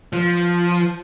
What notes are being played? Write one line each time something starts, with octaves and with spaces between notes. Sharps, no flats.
F3